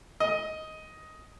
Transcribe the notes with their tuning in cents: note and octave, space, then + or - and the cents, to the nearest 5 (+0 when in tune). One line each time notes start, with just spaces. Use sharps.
D#5 +10